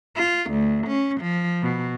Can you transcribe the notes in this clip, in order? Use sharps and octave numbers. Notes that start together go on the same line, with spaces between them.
F4
D2
C#4
F3
B2